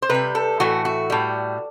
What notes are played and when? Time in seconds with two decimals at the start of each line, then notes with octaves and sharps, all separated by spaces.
0.02 C5
0.10 C3 G3 B4
0.35 A4
0.60 A2 E3 A3 F#4
0.85 F#4
1.10 A2 G3